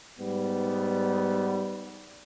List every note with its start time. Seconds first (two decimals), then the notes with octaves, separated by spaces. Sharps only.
0.19 G#2 G3 B3